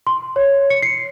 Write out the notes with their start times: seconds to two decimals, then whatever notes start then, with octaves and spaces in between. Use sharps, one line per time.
0.07 C6
0.36 C#5
0.70 C#7
0.83 C7